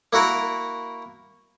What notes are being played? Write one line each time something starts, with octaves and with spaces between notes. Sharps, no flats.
A#3 E4 F#4 A#4